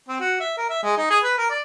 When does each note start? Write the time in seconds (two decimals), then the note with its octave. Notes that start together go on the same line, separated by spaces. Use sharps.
0.08 C4
0.20 F#4
0.40 E5
0.57 A#4
0.69 E5
0.83 G#3
0.97 D#4
1.10 G#4
1.23 B4
1.37 A#4
1.50 D5